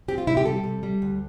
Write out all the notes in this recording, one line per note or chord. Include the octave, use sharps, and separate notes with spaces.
C4 G4
F4
C3 E4
G4
G3 A4
C3
G3
D2